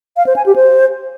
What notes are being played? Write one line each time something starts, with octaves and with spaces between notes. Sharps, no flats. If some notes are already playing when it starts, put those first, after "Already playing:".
F5
C5
G#5
G4
C5